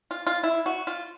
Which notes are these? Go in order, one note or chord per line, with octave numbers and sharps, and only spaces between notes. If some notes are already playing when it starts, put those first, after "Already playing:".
F4
F4
E4
F#4
F4